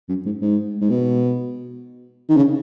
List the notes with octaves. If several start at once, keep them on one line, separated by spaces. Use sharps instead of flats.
F#2
G#2
G#2
G#2
B2
D#3
C#3